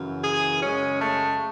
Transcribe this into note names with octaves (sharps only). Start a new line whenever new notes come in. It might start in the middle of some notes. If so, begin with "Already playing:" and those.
Already playing: F#2 C#3 E3
G#4
F#2 C#3 G#3 C#4
A3